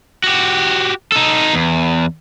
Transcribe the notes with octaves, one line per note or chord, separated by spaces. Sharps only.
F#4 G4
D#4 A4
E2